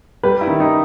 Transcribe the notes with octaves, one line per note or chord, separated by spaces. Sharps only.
G3 B4
E4
D#3
D#4